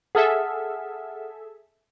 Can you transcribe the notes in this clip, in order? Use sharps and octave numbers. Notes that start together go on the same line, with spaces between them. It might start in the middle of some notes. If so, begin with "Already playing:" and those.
G#4 A4 E5 F#5 D#6 F6